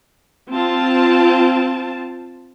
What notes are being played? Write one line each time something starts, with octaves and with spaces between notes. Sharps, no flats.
C4 F4 A5